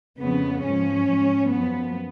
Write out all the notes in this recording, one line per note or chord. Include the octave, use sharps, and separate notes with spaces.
F2 C#3 F3 B3
G#2 F3 C#4
G#2 F3
F#2 F3 B3